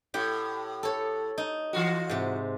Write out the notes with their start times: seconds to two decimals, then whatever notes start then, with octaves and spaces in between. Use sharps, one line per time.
0.14 A2 G4 F#5
0.83 A4 C#5
1.38 D#4
1.73 E3 F4 F#4
2.09 G#2 C3